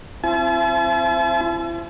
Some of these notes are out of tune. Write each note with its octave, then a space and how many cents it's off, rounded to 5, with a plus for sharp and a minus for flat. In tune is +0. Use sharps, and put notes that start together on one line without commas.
C4 +0 E4 +40 A5 -45